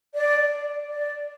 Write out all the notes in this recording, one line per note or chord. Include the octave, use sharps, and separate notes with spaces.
D5
D5